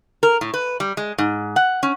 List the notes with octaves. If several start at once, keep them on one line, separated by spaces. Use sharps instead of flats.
A#4
A2
B4
G3
G#3
G#2
F#5
C#4